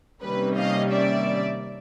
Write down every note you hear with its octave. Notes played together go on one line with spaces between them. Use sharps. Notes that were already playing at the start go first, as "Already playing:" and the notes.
C3 D#3 G3 A#3 C#4 B4
D#5 F5
D5 E5